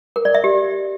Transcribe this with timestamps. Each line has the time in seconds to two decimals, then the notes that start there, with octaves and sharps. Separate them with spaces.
0.16 A#4
0.25 D5
0.35 E5
0.44 G4